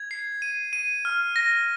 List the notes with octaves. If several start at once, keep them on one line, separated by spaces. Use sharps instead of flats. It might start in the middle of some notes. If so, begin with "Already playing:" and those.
Already playing: G#6
C7
D#7
D#7
F6
A#6